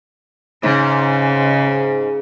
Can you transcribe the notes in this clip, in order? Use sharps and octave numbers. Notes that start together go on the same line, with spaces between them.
G#2 C#3